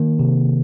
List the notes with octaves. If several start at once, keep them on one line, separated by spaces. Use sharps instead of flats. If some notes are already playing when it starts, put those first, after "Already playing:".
Already playing: D#3 A#3
C3